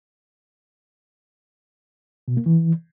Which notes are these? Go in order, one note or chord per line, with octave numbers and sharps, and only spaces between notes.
B2
A#3
E3